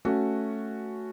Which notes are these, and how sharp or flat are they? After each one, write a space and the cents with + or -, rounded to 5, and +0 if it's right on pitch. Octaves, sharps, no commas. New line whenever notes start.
A3 +0 C#4 +0 F#4 +0